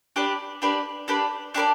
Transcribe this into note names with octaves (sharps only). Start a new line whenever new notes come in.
D4 G4 B4 D5
D4 G4 B4 D5
D4 G4 B4 D5
D4 G4 B4 D5